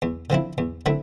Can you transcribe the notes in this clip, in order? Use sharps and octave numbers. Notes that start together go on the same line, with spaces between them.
E2
D3 F3 C4 E4
E2
D3 A3 C4 E4